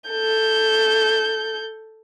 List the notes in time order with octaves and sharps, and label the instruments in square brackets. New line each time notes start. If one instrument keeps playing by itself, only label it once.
[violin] A4 G6